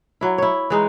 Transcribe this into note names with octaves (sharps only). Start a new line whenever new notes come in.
F#3 E4
E4 C#5
E3 G#3 D#4